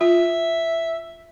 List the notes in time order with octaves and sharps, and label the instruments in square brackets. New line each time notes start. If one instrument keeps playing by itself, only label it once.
[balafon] F4 [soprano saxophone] E5